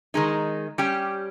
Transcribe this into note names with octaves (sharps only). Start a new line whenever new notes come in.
D#3 G#3 D#4
G3 C#4 G4